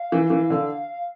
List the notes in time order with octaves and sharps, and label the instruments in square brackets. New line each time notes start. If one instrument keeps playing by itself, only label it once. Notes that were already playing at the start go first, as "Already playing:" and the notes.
Already playing: [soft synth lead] F5
[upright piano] E3
E3
D3